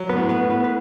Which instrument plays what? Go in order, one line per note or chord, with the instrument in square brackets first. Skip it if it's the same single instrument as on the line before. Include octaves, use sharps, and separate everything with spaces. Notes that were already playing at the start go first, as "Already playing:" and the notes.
Already playing: [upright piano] F#3
[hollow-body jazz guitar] B3 B4
[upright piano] A2
[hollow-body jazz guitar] B3 B4
[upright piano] A2
[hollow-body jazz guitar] B3 B4
B4